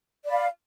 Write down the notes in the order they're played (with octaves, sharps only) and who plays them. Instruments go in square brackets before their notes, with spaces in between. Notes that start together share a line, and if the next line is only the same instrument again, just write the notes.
[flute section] D5
B5
F5